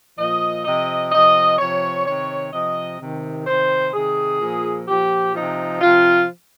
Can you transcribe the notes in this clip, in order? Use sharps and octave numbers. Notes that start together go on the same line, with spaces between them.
A#2 F3 D#5
C3 F3 D#5
C3 F3 D#5
C3 F3 C#5
C3 D#3 C#5
C3 F3 D#5
C3 D#3
C3 D#3 C5
C3 D#3 G#4
A#2 F3
A#2 F3 G4
C3 F3 D#4
C3 F3 F4